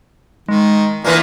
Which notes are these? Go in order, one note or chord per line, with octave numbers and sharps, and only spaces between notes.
D#3 G#3
A#2 E3 A#3 B3 G#5 A#6